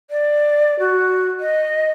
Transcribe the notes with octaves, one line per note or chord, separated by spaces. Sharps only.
D5
F#4
D#5